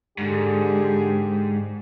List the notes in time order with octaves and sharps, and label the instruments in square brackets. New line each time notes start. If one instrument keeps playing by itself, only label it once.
[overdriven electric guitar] G#2 [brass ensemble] D3 G4 G#4